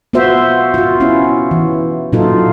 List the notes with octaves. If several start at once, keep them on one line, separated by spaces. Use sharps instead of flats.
B3 F4 F#4 C5 E5
F4 F#4
B3 C#4 E4
E3
A#2 F#3 D#4 F4 A4